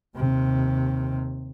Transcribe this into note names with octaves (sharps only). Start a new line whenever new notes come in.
D#2 C3